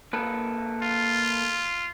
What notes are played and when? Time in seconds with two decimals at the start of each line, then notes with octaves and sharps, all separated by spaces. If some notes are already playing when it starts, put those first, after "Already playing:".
0.13 A#3 A4 B4
0.83 F4